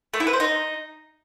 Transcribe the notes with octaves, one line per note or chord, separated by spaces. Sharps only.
A3
E4
B4
C5
D#4